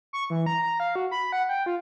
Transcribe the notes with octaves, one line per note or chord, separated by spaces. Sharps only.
C#6
E3
A#5
A#5
F5
F#4
B5
F#5
G5
F4